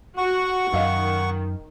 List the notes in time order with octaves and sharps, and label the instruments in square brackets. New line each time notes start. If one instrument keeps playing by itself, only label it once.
[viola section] F#4 [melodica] F#5 C#6
[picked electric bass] F#2 [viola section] D#3 [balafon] D#5 F5